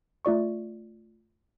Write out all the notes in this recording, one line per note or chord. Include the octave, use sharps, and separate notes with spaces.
A3 F4 D5 C#6